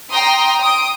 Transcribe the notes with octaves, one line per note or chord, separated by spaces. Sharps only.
G5 A#5 C6 D#6
D#6 D7